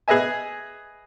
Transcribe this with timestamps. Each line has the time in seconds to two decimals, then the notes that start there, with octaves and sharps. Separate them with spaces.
0.08 G#4 B4 D#5 E5 G#5